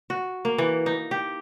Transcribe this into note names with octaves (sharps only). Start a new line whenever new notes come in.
F#4
A#3
E3
D#4
G4